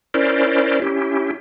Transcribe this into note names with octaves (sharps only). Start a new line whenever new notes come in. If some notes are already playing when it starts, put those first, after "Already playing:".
C#4 E4 A#4 C5 D5
C#4 E4 G4